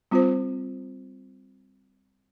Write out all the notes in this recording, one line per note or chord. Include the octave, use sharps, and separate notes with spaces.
G3 C4 F4 C5